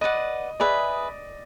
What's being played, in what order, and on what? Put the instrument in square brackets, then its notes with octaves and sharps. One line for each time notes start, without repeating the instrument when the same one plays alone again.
[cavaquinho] B4 D5 F#5 [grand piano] D#5
[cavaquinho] G#4 B4 E5 [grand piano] D5